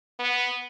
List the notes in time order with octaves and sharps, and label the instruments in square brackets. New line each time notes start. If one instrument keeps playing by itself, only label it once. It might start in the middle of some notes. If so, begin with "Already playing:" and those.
[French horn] B3